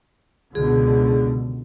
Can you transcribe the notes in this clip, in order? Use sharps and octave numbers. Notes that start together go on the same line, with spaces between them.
C#2 B2 D3 G#4